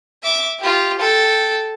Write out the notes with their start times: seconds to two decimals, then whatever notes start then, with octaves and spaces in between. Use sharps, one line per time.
0.23 E5 D6
0.59 F4 G4
0.99 A4 G5